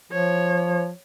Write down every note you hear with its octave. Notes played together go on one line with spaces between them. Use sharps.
F3 C#5